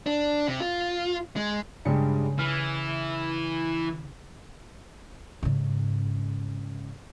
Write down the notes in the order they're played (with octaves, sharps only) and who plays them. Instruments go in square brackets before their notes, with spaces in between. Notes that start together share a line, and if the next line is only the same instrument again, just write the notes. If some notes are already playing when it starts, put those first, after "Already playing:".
[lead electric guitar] D4
C3
F4
G#3
[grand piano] G2 G3 G#3 [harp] C#3 C#7
[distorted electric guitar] E3 [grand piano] F6
[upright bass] G#2 C#3